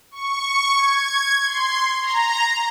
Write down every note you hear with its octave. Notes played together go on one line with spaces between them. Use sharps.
C#6
G#6
C6
A#5